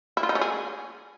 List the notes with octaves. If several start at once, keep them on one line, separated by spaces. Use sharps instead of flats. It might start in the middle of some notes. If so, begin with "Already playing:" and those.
E4
F4
D#4
C#4
G#4